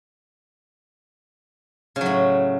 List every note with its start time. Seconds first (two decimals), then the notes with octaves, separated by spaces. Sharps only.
1.96 C#3
2.01 F#3
2.06 A2